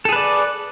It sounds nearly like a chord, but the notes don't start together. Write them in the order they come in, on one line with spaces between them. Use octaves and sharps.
A4 G#4 B4 D5